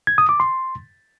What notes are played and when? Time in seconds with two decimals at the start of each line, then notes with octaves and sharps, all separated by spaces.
0.07 G#6
0.18 D#6
0.29 D6
0.40 C6